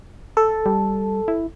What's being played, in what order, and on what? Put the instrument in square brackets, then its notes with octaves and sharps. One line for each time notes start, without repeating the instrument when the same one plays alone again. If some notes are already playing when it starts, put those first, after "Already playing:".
[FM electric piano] A4
[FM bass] G3
E4